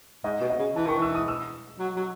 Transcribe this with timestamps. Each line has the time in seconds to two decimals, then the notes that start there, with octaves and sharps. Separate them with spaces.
0.24 G#2 D#5
0.41 B2
0.50 D#5
0.59 C#3
0.76 E3 A5
0.87 D#3 C#6
0.97 E3 E6
1.15 D#6
1.28 E6
1.79 F#3
1.96 F#3